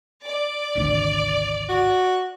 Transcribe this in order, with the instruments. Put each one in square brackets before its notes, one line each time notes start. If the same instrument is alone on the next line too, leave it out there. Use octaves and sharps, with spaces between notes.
[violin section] D5
[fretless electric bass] G#1 D2 C3
[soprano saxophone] F#4